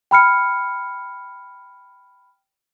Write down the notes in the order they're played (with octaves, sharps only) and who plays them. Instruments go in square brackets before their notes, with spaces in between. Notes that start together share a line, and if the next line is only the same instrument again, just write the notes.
[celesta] G5 B5 F6 C#7